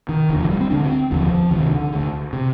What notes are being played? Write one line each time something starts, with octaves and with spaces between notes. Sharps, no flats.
D#3
F1 D#2 D3
F3
G3
C4
D2 D3 D4
C4
F1 D#2 D3 F3
D2 C3 D#3
D3
D2 D3
C3